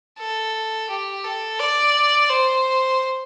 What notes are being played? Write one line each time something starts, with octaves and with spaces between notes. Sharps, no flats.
A4
G4
A4
D5
C5